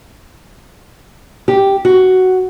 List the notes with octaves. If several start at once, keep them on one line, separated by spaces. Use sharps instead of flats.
G4
F#4